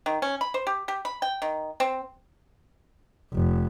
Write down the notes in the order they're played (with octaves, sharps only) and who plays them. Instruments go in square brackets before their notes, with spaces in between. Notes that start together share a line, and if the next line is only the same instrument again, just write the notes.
[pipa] D#3
C#4
B5
C5
G4
G4
B5
G5
D#3
C4
[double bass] F1